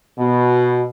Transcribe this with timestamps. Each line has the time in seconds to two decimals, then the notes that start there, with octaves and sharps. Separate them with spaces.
0.18 B2